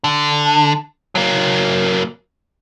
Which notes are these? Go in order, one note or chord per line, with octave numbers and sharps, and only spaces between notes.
D3
F#3 A#3